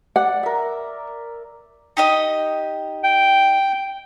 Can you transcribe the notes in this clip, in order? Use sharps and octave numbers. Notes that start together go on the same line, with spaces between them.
D5 F#5
A#4 E5
D#4 G4 D#5
G5